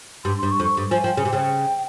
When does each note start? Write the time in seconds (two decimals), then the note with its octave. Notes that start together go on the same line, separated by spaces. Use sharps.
0.24 G2 C6
0.38 G2 C6
0.51 C#6
0.60 F2
0.64 C#6
0.77 G2
0.91 F3 G#5
1.04 F3 G5
1.17 C#3 G#5
1.25 C3
1.31 C#3 G5